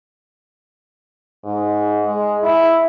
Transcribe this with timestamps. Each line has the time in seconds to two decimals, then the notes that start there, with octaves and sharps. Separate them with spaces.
1.44 G#2
2.06 G#3
2.43 E4